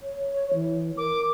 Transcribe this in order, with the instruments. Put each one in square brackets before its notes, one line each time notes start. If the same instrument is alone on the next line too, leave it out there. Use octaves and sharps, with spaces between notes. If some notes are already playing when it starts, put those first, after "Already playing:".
[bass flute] C#5
E3
[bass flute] A#4 [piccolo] D6